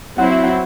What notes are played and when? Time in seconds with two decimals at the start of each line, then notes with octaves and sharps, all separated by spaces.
0.18 F#3 C4 E4 F#5
0.30 E5
0.44 F#5